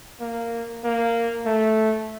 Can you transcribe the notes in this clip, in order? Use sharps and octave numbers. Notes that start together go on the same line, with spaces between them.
A#3
A#3
A3